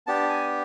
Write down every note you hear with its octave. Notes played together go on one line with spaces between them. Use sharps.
B3 D4 G4 A5
G#5